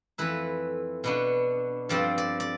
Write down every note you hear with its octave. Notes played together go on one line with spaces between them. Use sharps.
F2 E3 A3 E4 B4
B2 B3 D4
G2 F3 C4 D5
D5
D5